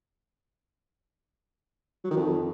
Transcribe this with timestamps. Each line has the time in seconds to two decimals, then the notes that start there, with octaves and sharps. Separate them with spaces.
2.04 F#3
2.11 D#3
2.17 F2